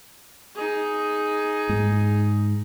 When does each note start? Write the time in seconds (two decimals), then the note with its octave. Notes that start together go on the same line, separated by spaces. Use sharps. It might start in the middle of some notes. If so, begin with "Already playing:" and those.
0.55 D#4 G#4
1.69 G#2